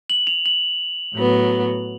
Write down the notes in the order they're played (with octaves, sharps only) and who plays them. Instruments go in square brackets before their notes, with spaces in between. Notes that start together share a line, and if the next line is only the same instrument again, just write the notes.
[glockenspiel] F#7
F7
F#7
[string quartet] A2 F#3 B3